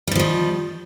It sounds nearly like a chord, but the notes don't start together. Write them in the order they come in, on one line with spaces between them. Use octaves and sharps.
G3 D3 F3 D#3